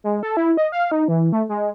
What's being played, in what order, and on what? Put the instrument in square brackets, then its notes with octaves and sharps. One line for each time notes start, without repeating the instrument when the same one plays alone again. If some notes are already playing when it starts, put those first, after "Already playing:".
[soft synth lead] G#3
A4
E4
D#5
F5
D#4
E3
A3
G#3